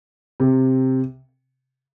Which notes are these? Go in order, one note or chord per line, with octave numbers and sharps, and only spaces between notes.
C3